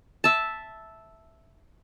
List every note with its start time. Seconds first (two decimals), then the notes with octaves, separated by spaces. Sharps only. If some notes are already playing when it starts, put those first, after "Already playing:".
0.24 E5 A5